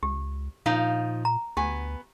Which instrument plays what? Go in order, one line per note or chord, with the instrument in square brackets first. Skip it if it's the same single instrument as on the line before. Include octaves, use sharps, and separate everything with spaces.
[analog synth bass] C#2 [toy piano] G4
[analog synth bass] A#2 [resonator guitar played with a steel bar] F3 D#4 F5
[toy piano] A#5
[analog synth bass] D2 [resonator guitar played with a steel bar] B3 G#5 [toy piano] G4